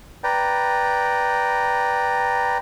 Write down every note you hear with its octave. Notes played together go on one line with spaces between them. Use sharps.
B4 D5 G5 A#5